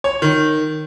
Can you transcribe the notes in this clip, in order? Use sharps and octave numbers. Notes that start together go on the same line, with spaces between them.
C#5
D#3